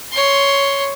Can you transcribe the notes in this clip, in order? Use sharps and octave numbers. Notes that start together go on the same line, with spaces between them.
C#5 C6